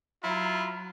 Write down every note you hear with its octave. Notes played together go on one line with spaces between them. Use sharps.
F#3 E4 F4 A#5 B5